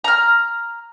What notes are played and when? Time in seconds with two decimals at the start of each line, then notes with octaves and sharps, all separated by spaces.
0.04 A#5 F6